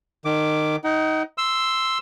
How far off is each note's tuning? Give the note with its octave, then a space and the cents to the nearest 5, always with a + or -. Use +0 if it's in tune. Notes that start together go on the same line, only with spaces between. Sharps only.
D#3 -20 D6 +0
D#4 +15 F#5 +45
C6 +0 E6 +0